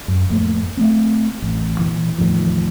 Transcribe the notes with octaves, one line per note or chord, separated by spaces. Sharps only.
F#2
F2 A2 A3 A#3
A3 B3 C4
A1
A#2 E3
E2 A2 D#3 F3